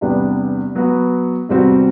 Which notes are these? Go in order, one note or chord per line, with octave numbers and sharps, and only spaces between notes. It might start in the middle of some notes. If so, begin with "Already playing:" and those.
E2 C3 G3 B3 D4
F#3 B3 F#4 B4
E2 C3 G3 C4 F#4